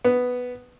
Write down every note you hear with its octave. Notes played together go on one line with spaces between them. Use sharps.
B3